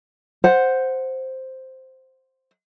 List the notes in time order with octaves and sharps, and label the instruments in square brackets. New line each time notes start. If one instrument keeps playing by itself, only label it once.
[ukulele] C5 F#5